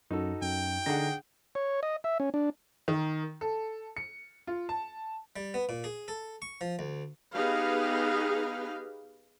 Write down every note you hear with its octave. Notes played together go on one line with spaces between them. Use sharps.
F#2 D#4 F#4 A4
F#2 G5
D3 D4 D#4 G#4 F#5 A#6
C#5
D#5
E5
C#4
D4
D#3
A4
C#7
F4
A5
G3
B3
A#2
G#4
A4
C#6
F3
D2
B3 D#4 G4 G#4 B4 F5